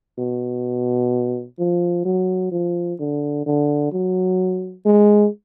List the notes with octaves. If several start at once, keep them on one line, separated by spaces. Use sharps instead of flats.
B2
F3
F#3
F3
D3
D3
F#3
G#3